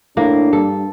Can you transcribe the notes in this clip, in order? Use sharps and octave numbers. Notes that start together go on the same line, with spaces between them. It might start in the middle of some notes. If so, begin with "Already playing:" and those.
A2 A#3 D4
G2 A4